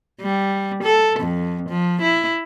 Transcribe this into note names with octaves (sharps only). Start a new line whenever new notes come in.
G3
A4
F2
F3
E4